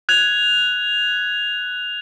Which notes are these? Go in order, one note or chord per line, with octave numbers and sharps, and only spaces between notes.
F#6 G#6 F7